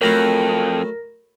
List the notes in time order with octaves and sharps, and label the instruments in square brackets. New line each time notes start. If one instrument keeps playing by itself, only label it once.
[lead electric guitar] F2 [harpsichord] F#3 A3 E4 [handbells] A#4 A#6